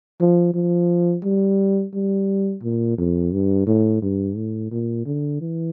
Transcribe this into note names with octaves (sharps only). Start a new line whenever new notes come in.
F3
F3
G3
G3
A#2
F2
G2
A2
G2
A2
A#2
D3
E3